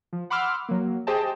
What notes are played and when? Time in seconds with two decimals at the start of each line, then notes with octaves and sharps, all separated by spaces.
0.13 F3
0.30 F#5 B5 C6 D6 E6 F6
0.69 F#3 A#3
1.07 G4 G#4 C5 D#5 G5 A5